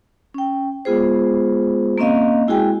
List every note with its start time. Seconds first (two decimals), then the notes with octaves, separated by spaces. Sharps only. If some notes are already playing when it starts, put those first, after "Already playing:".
0.34 C#4 G5
0.85 G#3 B3 F4 G#4 C5
1.98 A#3 C4 C#4 D#5 F5
2.48 G#3 E4 F#4 G#4 G5 G#5